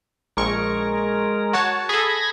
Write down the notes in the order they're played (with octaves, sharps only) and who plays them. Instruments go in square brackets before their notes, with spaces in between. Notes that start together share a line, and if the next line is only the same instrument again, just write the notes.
[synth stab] A#1 C#6 [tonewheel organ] G#3 A#4
[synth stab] F#4 C#5 A5
[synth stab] G#4 A4 [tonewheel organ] B5 G#6 A#6